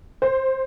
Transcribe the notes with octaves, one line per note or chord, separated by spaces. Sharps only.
C5